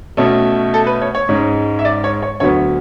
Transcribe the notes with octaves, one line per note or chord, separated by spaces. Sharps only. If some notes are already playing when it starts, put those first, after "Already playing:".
B2 A3 C#4
A4
B4
C#5
C#5
G#2 G#3 C#4
E5
D5
C#5
C#5
D2 D3 F#3 B3 C#5